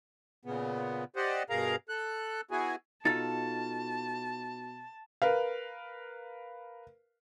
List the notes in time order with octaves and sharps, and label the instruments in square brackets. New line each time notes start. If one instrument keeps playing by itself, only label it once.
[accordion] A#2 C#3 B3
G4 C5 D5 D#5 F#5
G2 B2 G#4 A#4 F5 A#5
A4 F#6
B3 E4 F#4 G#4 G#5
[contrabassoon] B2 [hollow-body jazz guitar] D#4 F4 A4 [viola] A5 [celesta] A6
[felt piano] A#4 B4 F5